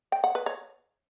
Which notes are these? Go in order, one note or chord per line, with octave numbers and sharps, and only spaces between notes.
G5
F#5
B4
C#5